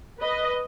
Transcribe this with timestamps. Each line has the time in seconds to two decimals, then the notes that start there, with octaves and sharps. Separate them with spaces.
0.20 B4 D#5